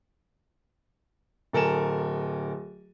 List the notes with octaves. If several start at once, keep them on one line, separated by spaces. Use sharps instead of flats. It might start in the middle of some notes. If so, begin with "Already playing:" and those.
D1 A4 A#4 G#5 E7